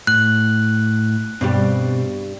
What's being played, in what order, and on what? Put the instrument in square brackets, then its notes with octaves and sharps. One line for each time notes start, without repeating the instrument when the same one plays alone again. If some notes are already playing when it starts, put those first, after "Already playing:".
[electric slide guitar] A2 [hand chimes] F#6
[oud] G2 G3 G4 [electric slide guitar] B2 C4